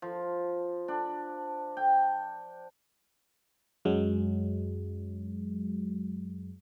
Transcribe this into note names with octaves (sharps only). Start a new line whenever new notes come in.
F3
D4
G5
F#2 F#3 G#3